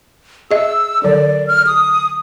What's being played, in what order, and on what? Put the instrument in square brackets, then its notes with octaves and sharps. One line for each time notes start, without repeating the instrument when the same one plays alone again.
[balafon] G#4 D#5 E5 [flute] E6
[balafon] D3 F#3 A4 [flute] D5
[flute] F6
D#6